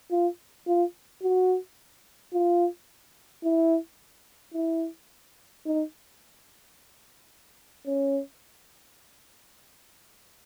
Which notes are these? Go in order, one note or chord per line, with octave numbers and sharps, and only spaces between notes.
F4
F4
F#4
F4
E4
E4
D#4
C#4